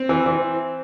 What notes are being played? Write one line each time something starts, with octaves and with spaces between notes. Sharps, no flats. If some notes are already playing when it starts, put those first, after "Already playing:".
Already playing: C4
E3
E3